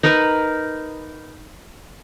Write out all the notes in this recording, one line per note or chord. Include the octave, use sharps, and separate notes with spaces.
D#4 A#4 B4